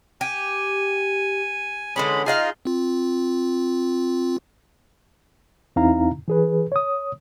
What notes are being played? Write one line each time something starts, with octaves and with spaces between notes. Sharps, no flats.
G4 G#5
D3 E3 G#3 C#4 B5
D#4 F4 G#4 D#5 F5
C4 F4
E2 C4 D#4 E4 F5 A#5
E3 G#4 B4
C#5 D#6